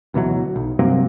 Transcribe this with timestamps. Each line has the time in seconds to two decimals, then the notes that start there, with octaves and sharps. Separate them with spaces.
0.14 D2 B2 E3 F#3
0.56 B1
0.79 G2 C3 F#3 A#3